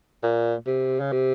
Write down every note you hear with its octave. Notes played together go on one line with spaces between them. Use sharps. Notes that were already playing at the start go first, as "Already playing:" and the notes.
A#2
C3
C#3
C3